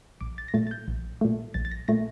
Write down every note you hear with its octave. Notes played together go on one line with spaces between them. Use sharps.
A#1 D6
A6
A#6
A#2 A3 A6
A6
G6
A#1
A#2 A3
A#1 A6
A6
A#6
A#2 A3 A#6